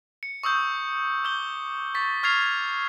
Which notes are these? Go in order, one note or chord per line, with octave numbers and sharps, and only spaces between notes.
C#7
C#6 D#6 E6 G6
D6 E6 G6 G7
C#6 A6 B6
C#6 F6 G#6 A6 C7 F7